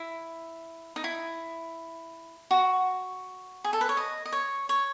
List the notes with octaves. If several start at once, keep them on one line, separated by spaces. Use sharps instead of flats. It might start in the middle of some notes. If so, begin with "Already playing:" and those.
Already playing: E4
D#4
E4
F#4
G#4
A4
B4
C#5
D#5
D#5
C#5
C#5